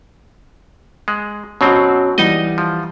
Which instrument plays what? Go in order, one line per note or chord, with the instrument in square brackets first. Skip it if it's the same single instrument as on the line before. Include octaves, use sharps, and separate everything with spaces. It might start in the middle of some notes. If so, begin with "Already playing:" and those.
[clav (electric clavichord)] G#3
[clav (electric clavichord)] B2 F#3 C4 [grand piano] C#4 F#4
[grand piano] E3 G3 F#5 [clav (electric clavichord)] D#4 D#5
[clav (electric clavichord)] F3